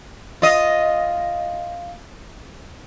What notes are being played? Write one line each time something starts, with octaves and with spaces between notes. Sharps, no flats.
F4 D#5